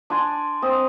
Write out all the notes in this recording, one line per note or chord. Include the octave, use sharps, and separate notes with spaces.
D4 D5 G#5 C6
C4 D#5